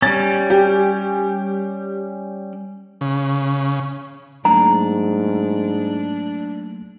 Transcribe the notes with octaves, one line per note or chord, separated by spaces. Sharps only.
G3 C#4 A6
G4
C#3
G#2 F#3 A3 A#3 D4 A#5